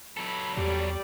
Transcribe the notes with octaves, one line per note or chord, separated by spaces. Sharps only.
F#3 A4 B5
E2 G3 G4 D5